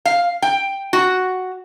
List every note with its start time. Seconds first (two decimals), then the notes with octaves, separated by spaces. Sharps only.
0.05 F5
0.42 G5
0.93 F#4